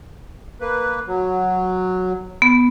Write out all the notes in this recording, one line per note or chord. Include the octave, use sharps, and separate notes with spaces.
A#3 B4
F#3
B3